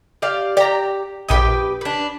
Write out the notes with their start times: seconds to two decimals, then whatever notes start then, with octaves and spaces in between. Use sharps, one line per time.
0.22 G4 D5 F5
0.57 G4 D5 A#5
1.29 A#1 G4 B4 G5 D#6
1.81 D4 B4